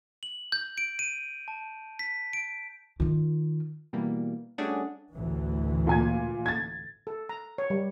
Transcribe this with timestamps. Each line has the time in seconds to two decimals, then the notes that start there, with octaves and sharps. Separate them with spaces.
0.23 F#7
0.52 G6
0.78 D7
0.99 D#7
1.48 A5
1.99 B6
2.33 D7
3.00 D#3 F4
3.93 B2 E3 G3 A#3
4.58 G3 A3 C#4 D4 F#4 G#4
5.14 A1 D2 E3
5.87 A#2 G#5 G#6
6.46 G#6 A6
7.07 A4
7.29 A#5
7.58 C#5
7.70 G3